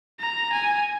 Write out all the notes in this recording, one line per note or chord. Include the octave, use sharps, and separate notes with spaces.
A#5
G#5